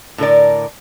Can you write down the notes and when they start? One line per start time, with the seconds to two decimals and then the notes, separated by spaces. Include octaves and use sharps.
0.18 A2 D3 A#4 D5